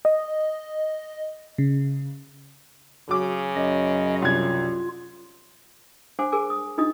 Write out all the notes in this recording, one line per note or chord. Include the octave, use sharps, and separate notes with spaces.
D#5
C#3
C#3 F#3 D6
F#2 D#5
C2 F4 G#6
D4 C5 F#5 G#5 D6
G#4 A#4 G#5 D6
D#6
D4 D#4 F4 D#5 D#6